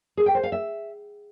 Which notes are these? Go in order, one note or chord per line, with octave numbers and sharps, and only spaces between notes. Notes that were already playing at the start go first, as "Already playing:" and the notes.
G#4
G5
C5
F5
E5